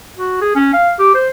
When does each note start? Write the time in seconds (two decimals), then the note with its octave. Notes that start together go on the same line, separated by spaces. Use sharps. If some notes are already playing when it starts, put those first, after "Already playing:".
0.17 F#4
0.41 G#4
0.55 C#4
0.73 F5
0.99 G4
1.15 C5